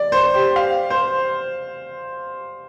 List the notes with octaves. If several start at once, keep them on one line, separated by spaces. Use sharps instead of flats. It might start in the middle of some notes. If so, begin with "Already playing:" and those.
Already playing: D5
C5
G4
F5
C5